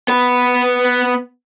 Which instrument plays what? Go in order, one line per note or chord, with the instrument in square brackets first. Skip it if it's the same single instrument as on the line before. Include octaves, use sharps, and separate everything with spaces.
[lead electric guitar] B3 B4